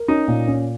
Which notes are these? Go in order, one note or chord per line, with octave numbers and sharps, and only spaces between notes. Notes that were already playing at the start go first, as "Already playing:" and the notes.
Already playing: A#4
C#4 D#4
A#2
C#4